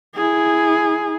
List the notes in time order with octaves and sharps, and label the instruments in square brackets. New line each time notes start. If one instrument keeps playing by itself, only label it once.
[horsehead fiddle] E4 G#4